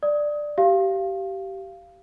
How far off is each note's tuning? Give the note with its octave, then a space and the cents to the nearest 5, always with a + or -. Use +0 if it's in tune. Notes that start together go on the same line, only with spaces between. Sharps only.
D5 +10 D#6 +25
G4 -20 F5 -15